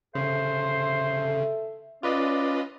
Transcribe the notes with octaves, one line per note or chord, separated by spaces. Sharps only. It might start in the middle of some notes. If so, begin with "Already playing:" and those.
C#3 A4 C5 E5
C#4 F4 B4 D5 D#5